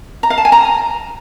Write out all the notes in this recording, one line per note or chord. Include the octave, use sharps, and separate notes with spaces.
A#5
F5
A5
G#5
A#5